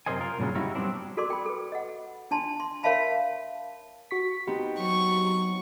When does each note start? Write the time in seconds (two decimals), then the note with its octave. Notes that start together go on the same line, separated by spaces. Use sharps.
0.06 F#2 C3 A#4 C5 D#5 G#5
0.19 F4 A#4
0.39 G2 A#2 C#3 F#3 G#3
0.55 G3 C#4 D#4 E4 F#4
0.75 F#3 G3 B3 C4 D4
1.17 F#4 A4 A#4 D5 C6 D6
1.30 G5 B5
1.46 A4 B4
1.72 D#5 F#5
2.31 D4 A5 C6
2.60 C6
2.83 A#4 C#5 E5 F5 A5 B5
4.11 F#4 C#6 B6
4.47 B3 C4 D#4 G4
4.80 F#3 C#6